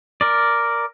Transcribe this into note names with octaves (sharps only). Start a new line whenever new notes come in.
A#4 D5